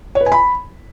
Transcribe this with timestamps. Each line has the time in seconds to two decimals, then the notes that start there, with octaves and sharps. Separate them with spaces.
0.15 C#5
0.21 B4
0.26 G#5
0.32 B5